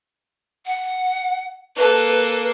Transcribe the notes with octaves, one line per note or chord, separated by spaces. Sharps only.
F#5
A#3 A4 B4